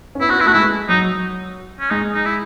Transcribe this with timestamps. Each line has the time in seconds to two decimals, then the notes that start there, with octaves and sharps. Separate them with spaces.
0.15 C#4
0.20 B3 E4
0.29 C#4 F#4
0.38 B3
0.40 E4
0.46 A3 F#4
0.54 G#3 E4
0.89 F#3 D#4
1.80 C#4
1.91 G#3 D#4
2.13 D#4
2.26 E4